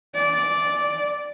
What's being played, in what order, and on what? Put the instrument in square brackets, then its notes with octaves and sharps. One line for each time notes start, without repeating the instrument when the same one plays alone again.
[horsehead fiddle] D5